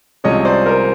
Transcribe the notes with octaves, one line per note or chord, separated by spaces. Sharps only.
C2 C3 F3 G#3 C#4 C#5 D#5
C5 D5
A#4 C5